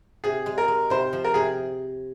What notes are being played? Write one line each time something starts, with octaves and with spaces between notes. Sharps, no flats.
C3 G#4
G#3
A#4
G#3
C3 C5
F3
A#4
C3 G#4